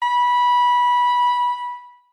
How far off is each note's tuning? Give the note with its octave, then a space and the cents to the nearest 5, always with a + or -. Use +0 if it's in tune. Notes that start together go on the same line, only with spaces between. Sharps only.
B5 -15